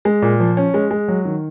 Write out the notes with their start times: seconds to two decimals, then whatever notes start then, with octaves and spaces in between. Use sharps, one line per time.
0.05 G#3
0.22 A#2
0.40 F3
0.57 C#4
0.74 G#3
0.91 G#3
1.08 F#3
1.25 D#3